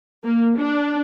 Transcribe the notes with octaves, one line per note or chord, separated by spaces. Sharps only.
A#3
D4